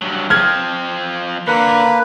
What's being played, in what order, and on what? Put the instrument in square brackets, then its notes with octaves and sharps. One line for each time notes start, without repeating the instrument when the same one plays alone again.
[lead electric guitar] G2 F#3
[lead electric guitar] F3 C4 [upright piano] F6 G#6
[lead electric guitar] D3 [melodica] A#3 B4